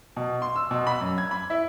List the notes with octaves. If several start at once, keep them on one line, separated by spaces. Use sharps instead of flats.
B2
C6
E6
B2
B5
F#2
G#6
B5
E4